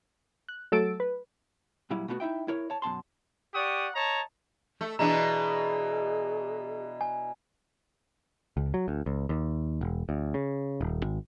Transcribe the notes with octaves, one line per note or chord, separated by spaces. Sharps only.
F#6
F#3 A3 A4 E6 A6 D7
B4
A#2 F#3 G3 E4
B2 A3 B3 F4 F#4
D#4 E4 E5 G5
E4 A#4 C#5
C#5 A5
F#2 B2 A5 C6
G4 D5 F#5 C#6 D#6
C#5 D#5 A5 A#5
A3
B2 E3 D4 G#4 A#5
G#5
C#2
F#3
D2
C#2
D#2
E1
D2
C#3
D#1
G#1